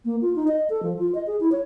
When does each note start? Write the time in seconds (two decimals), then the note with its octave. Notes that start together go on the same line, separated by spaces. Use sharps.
0.05 A#3
0.22 F4
0.36 D#4
0.48 D#5
0.70 A4
0.83 F3
0.99 F4
1.15 D#5
1.27 G#4
1.40 E4
1.52 C#5